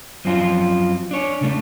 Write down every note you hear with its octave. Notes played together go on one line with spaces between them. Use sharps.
F#2 F3 F#3 C4 F4
D4 C#5
C#3 A3